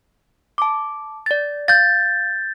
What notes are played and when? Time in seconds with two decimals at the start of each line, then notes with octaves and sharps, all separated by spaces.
0.58 A5 D6
1.26 D5 A6
1.68 F5 G6 A6